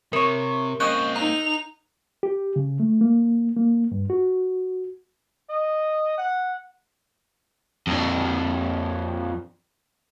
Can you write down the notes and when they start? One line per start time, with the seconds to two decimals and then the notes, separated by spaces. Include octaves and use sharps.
0.13 C3 E4 A#4 C#5
0.80 A#3 C4 C#4 D#5 D#6 F#6 G6
1.16 D#4 A#5 E6 F7
2.23 G4
2.56 C#3
2.80 A3
3.01 A#3
3.56 A#3
3.92 G2
4.10 F#4
5.50 D#5
6.18 F#5
7.87 F2 D4